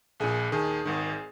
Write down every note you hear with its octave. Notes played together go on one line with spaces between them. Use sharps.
A#1 A#2 G#4
D#2 D#3 G#4
G#1 G#2 D#3